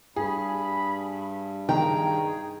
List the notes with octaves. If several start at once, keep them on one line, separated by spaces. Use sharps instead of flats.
G2 G#4 B5
D#3 G#4 G5 A#5